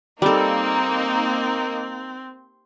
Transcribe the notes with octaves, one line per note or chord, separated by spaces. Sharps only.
G3 A#3 C4 D#4 A4